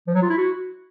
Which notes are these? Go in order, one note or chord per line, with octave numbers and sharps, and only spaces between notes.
F3
F#3
F4
E4
F#4